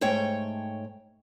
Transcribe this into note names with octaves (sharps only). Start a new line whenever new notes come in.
G#2 A3 C#5 G5